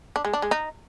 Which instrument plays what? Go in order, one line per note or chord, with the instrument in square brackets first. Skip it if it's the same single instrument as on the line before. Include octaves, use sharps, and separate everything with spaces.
[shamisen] D4
G#3
D4
G#3
D#4